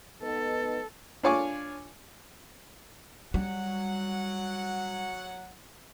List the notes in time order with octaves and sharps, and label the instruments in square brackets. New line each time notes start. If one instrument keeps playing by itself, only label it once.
[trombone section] B3 D#4 [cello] A4
[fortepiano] D4 F4 C#5 G#5 C#6 D6
[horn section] F#3 F#5 [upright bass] G3